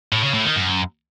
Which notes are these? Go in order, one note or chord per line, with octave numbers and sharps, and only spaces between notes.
A2
C#3
A2
D#3
F#2